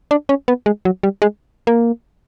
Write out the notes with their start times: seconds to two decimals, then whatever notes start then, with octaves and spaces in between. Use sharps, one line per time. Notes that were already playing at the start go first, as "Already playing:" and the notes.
0.11 D4
0.29 C#4
0.48 B3
0.66 G#3
0.85 F#3
1.03 G3
1.22 G#3
1.67 A#3